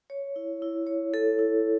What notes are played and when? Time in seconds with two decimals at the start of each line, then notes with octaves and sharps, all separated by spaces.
0.10 C#5
0.36 E4
0.62 E4
0.87 C#5
1.14 A4
1.39 E4